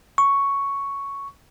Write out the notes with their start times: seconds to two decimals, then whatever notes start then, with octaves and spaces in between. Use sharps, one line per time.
0.18 C#6